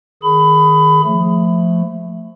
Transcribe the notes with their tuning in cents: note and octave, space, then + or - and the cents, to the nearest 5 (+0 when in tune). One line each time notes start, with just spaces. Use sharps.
D#3 +0 G#4 +10 B5 +20
F3 +0 A3 +0